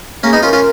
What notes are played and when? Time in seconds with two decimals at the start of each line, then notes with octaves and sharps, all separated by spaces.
0.23 A#3 C#4 G#4
0.33 B3 D#4
0.43 C#4 F4 A#4
0.53 C#4 F4